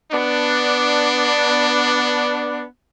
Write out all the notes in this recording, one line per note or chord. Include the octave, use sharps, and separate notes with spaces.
B3 D4